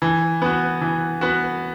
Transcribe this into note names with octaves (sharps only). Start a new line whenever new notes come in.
E3
B3 F#4
E3
B3 F#4